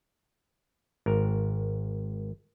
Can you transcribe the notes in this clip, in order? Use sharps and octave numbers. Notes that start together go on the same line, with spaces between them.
G#1 A#4